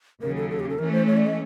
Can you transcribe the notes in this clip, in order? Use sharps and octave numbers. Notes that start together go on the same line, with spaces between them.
D#2 C#3 F#3 A#4
A4
A4
G4
A4
E3 A3 C#4 A#4
C5
C#5
D5
D#5